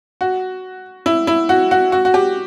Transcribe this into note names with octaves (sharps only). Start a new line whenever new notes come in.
F#4
E4
E4
F#4
F#4
F#4
F#4
G4